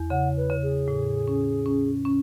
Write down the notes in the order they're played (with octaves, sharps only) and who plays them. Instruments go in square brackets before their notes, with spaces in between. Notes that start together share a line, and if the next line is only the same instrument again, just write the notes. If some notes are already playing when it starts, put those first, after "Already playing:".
Already playing: [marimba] E2
[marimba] C#3 [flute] F#5
[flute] B4
[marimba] C#3
[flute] G#4
[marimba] A2
C#4
C#4
C#4